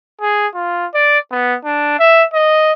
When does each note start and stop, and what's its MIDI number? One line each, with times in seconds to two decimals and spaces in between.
0.21 0.47 68
0.54 0.86 65
0.94 1.18 74
1.31 1.56 59
1.64 1.95 62
1.99 2.24 76
2.34 2.73 75